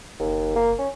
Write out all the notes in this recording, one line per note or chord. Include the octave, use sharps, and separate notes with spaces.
F#1 D#2
A#3
C#4